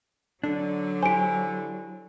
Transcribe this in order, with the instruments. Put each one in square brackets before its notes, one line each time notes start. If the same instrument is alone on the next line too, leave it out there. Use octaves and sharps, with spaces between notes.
[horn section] D3 [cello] F#3 [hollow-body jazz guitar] D4
[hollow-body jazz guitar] E4 G4 C5 [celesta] G#5 D7